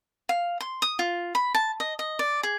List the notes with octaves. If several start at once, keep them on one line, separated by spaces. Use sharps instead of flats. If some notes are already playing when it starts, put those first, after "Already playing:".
F5
C6
D#6
F4
B5
A5
D#5
D#5
D5
G#4